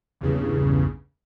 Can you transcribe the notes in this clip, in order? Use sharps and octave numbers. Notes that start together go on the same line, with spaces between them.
A#1 E2 G2 C#3